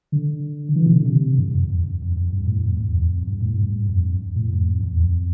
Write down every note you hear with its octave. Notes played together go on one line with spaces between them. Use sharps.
D3
E3
C3
D3
C3
G2
F2
F2
F2
F2
G2
A2
F2
E2
F2
G2
A2
G2
F2
A2
F2
E2
F2